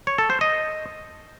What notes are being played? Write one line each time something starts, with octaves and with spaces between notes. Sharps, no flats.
C#5
A4
C5
D#5